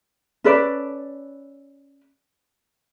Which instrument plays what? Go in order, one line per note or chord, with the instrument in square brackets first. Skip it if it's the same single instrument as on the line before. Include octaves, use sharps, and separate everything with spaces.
[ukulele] C#4 A4 B4 D5